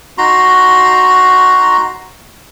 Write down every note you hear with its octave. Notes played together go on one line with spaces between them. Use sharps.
D#4 F#4 A#5 C6